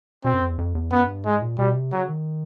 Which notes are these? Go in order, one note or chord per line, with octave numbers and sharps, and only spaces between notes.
B2 C4
F#2
F2
E2
F2
E2
F#2 B3
G2
G#2 G#3
A#2
B2 G3
C3
C#3 F#3
D#3